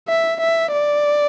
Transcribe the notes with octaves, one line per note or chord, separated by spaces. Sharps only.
E5
E5
D5